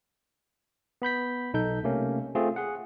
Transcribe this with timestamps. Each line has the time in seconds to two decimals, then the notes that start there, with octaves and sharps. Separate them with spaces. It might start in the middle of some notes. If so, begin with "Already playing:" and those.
1.02 B3 B5 G6 B6
1.54 B1 D#4 A4 G6
1.84 C3 A3 A#3 C#4
2.35 A3 C4 F4 G#4
2.56 G#4 F#5